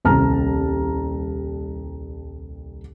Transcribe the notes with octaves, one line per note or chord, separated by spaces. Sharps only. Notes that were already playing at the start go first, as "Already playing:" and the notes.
D#1 C2 A5 A#5 F6